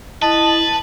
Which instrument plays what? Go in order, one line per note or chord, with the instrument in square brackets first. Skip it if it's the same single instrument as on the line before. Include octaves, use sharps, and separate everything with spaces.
[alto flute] E4 [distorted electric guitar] B4 [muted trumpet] D#5 [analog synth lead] A5